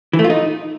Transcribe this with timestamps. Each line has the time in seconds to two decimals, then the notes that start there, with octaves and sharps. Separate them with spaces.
0.13 E3
0.19 A3
0.24 F4
0.30 D#4